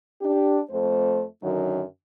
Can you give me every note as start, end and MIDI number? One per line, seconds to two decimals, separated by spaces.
0.22 0.60 62
0.22 0.60 67
0.70 1.24 41
0.70 1.24 57
0.70 1.24 72
1.43 1.83 42
1.43 1.83 50
1.43 1.83 51
1.43 1.83 54